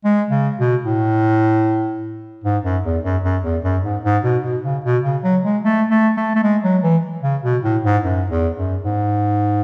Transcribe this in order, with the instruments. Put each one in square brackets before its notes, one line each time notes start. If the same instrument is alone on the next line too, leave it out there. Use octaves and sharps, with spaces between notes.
[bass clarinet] G#3
C#3
B2
A2
G#2
F#2
E2
F#2
F#2
E2
F#2
G#2
G#2
B2
B2
C#3
B2
C#3
F#3
G#3
A3
A3
A3
A3
G#3
F#3
E3
C#3
B2
A2
G#2
F#2
E2
F#2
G#2